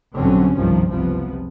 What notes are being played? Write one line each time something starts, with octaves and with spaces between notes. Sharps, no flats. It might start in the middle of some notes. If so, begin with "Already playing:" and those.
B1 G2 D3 F#3 C4 C#4
F#1 C2 G2 D#3 F3
F#1 C2 C3 F3 B3